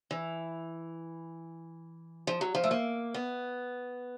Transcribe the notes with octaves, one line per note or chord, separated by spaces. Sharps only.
E3
F3
F#3
F3
A3
A#3
B3